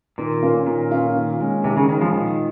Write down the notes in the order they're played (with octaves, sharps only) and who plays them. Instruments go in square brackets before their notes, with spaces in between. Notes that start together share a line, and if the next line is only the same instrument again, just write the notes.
[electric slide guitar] A#2 [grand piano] D#3
[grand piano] A#3 C#4 F4
[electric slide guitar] A#2 [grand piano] D#3
[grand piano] A#3 C#4 F4
D#3
G#3 C#4
[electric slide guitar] C3 [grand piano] D#3
[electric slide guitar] C#3
[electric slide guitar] D#3 [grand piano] G#3 C#4
[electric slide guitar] F3
[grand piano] A#2 [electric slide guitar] D#3